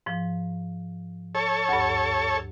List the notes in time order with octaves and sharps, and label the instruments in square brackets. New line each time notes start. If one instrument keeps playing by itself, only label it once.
[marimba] G#2 F3
[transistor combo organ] A4 C#5
[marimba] D2 G2